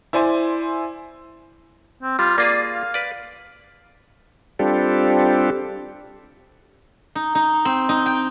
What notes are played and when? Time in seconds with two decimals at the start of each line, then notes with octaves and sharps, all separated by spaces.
0.13 E4 C5 D5 G#5 C6
2.03 C4
2.19 G3 F4
2.38 A#3 F4 G#4 D5
2.72 F5
2.94 B4 D5
4.59 G3 C4 D4 F4 G4 A4
7.15 D#4
7.35 D#4
7.65 C4
7.89 D#4
8.06 G5